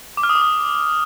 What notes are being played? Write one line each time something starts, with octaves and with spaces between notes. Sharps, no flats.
D6
F6
D#6
D6
D#6